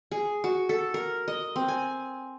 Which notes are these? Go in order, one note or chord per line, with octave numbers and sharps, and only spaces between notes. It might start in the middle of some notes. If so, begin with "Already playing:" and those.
G#4
F#4
A4
A#4
D#5
C4
G#5